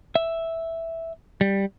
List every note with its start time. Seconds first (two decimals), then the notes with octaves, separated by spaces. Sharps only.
0.15 E5
1.41 G3